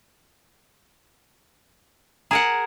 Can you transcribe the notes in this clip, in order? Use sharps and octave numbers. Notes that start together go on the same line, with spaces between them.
G#4 A#4 F#5 A#5